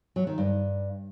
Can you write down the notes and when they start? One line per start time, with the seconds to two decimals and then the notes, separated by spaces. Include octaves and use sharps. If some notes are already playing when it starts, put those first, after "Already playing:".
0.16 F#3
0.27 D#3
0.38 G2